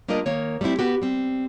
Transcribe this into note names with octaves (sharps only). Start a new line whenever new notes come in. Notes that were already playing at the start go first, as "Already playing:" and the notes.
G3 A#3 D4 F4 A#4 D#5
D#3 A#3 C#5
G3 A3 A#3 C4 E4
B3 F#4 G4
G3 C4